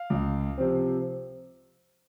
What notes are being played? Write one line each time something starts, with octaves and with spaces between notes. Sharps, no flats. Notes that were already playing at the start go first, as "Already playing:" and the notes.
Already playing: F5
C#2
C3 F3 C4